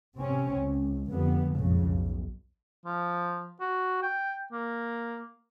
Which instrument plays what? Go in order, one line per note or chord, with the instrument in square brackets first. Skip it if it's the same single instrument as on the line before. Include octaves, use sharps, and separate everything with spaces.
[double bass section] C3 C4 C#4
C#2
F2 D3 G3 B3
A#1 F2 G#2 C#3
B1
[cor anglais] F3
F#4
G5
A#3